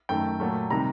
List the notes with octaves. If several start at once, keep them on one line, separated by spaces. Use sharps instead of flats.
F#2 D#3 A3 G5
A#2 F#3 A3
C3 D#3 G3 A#5